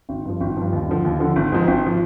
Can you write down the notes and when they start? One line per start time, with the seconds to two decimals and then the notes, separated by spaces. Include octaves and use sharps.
0.09 G#1
0.25 G2 F3
0.40 G#1
0.57 G2 F3
0.72 D#2
0.88 D3 F3
1.05 D#2
1.20 D3 F3
1.36 G#1
1.52 G#2 F3
1.67 G#1
1.86 F3